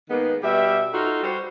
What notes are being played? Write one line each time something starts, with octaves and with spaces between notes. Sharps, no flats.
D#3 G#3 A#3 B3
B2 G3 E5
D#4 F4 F#4 A4
G3 F#4 C5